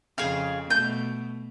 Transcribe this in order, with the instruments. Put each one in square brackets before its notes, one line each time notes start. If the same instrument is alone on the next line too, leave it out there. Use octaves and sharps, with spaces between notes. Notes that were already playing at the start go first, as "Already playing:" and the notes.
[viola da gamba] F2 C#3 [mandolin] G#4 F5
[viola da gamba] B2 A3 [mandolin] G6